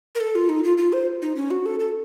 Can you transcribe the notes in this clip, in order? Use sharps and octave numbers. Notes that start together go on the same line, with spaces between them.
A#4
A4
F4
D#4
F4
F4
C5
D#4
C#4
F#4
A4
A4